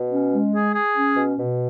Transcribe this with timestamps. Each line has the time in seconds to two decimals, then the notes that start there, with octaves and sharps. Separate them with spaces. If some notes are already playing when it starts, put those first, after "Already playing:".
Already playing: B2
0.11 C#4
0.31 G#3
0.52 G#4
0.73 G#4
0.94 C#4
1.15 B2
1.36 B2